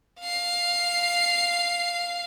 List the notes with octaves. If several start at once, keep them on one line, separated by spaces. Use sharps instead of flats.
F5 C7